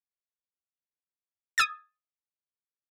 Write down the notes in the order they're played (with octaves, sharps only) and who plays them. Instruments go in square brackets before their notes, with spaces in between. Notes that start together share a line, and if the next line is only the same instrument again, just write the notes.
[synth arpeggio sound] D#6 E6 G#6 A6